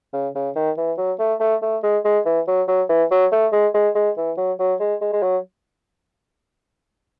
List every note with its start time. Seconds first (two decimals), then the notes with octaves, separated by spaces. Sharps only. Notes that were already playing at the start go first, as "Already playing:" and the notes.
0.14 C#3
0.35 C#3
0.56 D#3
0.78 E3
0.98 F#3
1.19 A3
1.40 A3
1.63 A3
1.83 G#3
2.05 G#3
2.26 E3
2.48 F#3
2.68 F#3
2.89 E3
3.11 F#3
3.32 A3
3.52 G#3
3.74 G#3
3.95 G#3
4.17 E3
4.37 F#3
4.60 F#3
4.80 G#3
5.01 G#3
5.13 G#3
5.22 F#3